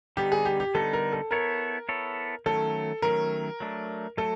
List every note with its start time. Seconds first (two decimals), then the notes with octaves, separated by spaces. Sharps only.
0.17 D3 G3 B3 D#4 G4
0.32 G#4
0.45 G4
0.60 G4
0.75 D3 G3 B3 D#4 A4
0.93 A#4
1.13 A4
1.31 B3 E4 A4 A#4 C#5
1.89 B3 E4 A4 C#5
2.46 D#3 F#3 A3 C#4 A4
3.02 D#3 F#3 A3 C#4 A#4
3.60 F#3 A3 D4
4.17 F#3 A3 A4